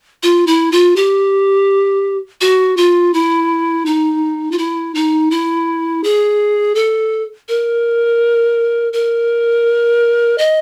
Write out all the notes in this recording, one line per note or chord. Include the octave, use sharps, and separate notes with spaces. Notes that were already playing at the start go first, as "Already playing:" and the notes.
F4
E4
F4
G4
F#4
F4
E4
D#4
F4
E4
D#4
E4
G#4
A4
A#4
A#4
D#5